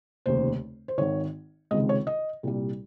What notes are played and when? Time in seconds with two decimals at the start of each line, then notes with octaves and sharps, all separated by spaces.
0.26 F1 D#2 C#3 C5
0.88 C5
0.98 G#1 G#2 D#3 C#5
1.71 C#2 C3 D#3 G#3 D#5
1.89 C#5
2.07 D#5
2.43 C2 A#2 G3